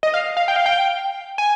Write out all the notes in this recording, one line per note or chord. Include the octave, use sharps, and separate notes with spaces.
D#5
F5
F5
G5
F5
G5
G#5